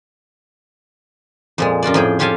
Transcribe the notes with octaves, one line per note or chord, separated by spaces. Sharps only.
F2 A#2 G#3
F#2 F4 F#4 D5
F2 A2 G#4 G5
C#4 F4 G4 A4 F5 G#5